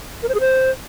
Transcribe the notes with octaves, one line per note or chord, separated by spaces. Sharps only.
A#4
C5
G#4
C5